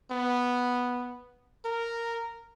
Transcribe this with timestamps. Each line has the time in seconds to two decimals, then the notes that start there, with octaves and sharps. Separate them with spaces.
0.11 B3
1.65 A#4